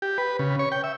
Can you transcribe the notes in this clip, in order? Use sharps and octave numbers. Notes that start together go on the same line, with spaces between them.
G4
B4
C#3
C#5
G5
E5